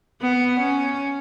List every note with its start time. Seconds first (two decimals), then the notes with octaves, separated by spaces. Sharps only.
0.22 B3
0.59 C#4